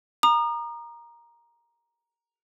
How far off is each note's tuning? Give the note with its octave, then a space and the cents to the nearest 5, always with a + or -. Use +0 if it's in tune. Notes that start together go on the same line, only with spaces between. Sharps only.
A#5 +10 D#6 -40